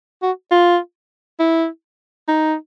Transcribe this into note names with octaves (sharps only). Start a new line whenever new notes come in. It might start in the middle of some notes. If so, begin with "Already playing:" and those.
F#4
F4
E4
D#4